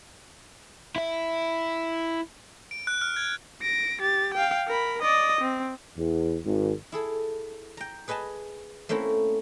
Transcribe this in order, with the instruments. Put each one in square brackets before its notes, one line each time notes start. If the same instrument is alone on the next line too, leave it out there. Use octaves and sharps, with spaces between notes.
[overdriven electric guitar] E4 E5
[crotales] D7
F#6
F6
G#6
[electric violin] A#6 D7
G4 A6
F5 G5
A#4 B5
D5 D#5
C4
[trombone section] E2
G#1
[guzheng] E4 G#4 A4
G5 A#5
G#4 B4 D#5 G#5 A5
A3 A#3 C4 C#4 E4